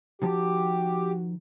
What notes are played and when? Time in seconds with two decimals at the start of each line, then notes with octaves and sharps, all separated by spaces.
0.22 D#3 F3 F#4 G4 A5